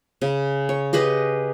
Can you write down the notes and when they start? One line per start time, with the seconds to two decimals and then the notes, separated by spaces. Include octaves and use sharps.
0.22 C#3
0.69 C#5
0.93 G4 G#4 B4 D#5